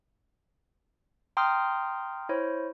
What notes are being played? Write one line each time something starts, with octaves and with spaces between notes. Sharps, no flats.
G5 A#5 C6 D#6 F6 G6
E4 C5 C#5